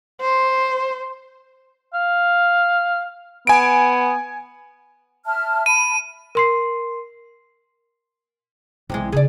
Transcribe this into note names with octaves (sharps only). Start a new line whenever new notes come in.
C5
F5
B3 G#5 D7
E5 A5 F6
A5 B5 D#7
A#4 C6 C7
B1 C3 E3 G#3
C#3 D#4 G#4 D5